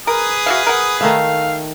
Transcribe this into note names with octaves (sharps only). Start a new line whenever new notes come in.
G#4 A#4 B4 D#6
F#4 E5 F5
A#4 F#5
D#3 A3 E5 F5